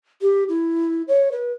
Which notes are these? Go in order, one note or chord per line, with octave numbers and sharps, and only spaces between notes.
G4
E4
C#5
B4